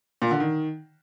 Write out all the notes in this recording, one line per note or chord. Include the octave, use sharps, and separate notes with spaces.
A#2
D3
D#3